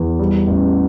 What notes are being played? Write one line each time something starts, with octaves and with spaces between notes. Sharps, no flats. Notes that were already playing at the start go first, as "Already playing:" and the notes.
Already playing: E2
G3
A1